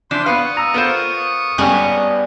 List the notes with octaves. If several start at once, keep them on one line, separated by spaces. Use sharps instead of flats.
E3 F3 D4 C6 G6
B3 B4 F5 C#6 D#6
A#5 E6
B3 F4 A4 A#4 C5
G#1 G2 G3 B3 C#4 G#4